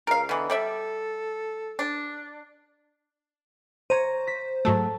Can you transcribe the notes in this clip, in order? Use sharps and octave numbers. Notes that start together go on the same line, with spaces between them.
C#2 A#4 F5
B2 D3 E3
G3 A4 D5 E5
D4
C5 C#5 A#5 D#7
A#6 B6
G#2 F#3 A3 A4 A5